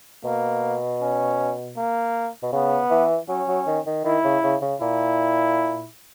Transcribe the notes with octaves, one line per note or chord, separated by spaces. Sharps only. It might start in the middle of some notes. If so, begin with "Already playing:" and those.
B2 A#3
C#4
A#3
B2
C#3 B3
E3
F#3 C#4
F#3
D#3
D#3
D#3 E4
C#3
C#3
C#3
A#2 E4